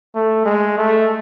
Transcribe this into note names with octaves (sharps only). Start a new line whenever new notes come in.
A3
G#3
A3